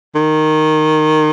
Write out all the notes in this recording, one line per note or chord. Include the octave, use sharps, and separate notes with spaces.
D#3